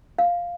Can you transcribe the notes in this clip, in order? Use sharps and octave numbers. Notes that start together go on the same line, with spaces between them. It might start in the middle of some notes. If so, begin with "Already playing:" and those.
F5